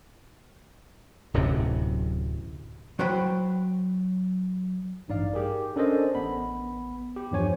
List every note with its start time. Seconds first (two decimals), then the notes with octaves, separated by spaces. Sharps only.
1.34 D1 F#2 C3
2.99 F#3 F#4 C5 G5 B5
5.08 A1 G2 D#4 D5 F5
5.33 G4 G#4 A#4
5.76 C#4 D4 A4 A#4 C5 D#5
6.15 A1 B3 B5
7.16 G4
7.31 E2 G2 F3 C5 C#5 G#5